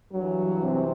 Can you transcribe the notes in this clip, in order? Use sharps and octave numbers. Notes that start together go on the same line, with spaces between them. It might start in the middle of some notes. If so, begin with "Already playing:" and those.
G2 F#3
E3
C3 C4